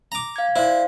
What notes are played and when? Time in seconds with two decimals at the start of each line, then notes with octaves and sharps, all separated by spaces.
0.12 A#5 D6
0.36 F5 G#6
0.56 E4 C5 D5 F5